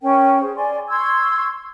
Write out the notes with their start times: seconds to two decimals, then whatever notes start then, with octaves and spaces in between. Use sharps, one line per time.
0.02 C#4 A#4 G5
0.41 G#4 C5
0.56 D5 G#5 C6
0.88 C6 C#6 E6 G#6